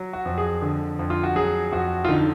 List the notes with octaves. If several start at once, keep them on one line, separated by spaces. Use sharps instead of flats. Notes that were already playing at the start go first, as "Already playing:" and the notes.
Already playing: F#3
F#4
F2
G#4
D3
F2
F4
F#4
F#3 G#4
F2 F#4
F4
D3 D#4